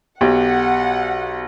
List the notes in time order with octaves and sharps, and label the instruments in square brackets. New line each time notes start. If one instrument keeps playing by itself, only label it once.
[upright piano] B1 [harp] G4 [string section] F#5